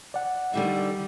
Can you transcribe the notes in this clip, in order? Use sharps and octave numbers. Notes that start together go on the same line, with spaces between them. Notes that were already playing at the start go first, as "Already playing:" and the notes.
D5 F#5
D3 D#3 G3 E5